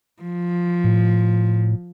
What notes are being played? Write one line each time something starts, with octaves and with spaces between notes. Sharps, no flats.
F3
A2